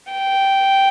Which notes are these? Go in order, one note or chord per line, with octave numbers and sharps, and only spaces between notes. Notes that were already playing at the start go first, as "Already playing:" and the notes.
G5